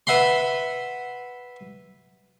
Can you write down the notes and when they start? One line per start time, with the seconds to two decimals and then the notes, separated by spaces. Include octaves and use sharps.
0.07 B4 E5 F#5 B5 C6